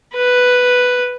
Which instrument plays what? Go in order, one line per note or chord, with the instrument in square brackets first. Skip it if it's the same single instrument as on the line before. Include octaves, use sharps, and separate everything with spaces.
[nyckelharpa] B4